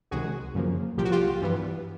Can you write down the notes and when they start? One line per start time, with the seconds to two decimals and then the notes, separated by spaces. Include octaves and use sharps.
0.11 C#2 C3 D#3 G#3 F#4 G#4
0.54 F#2 C#3 F3 A#3
0.97 C2 A#2 F3 G4
1.05 F#4
1.11 F4 G4
1.41 G2 E3 G3 B3